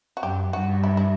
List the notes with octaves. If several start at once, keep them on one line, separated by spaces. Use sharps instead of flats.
F#4
F#2 G4
G2 F#4
E4
E4